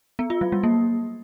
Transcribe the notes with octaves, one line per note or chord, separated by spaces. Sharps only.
B3
F4
F#3
G3
A#3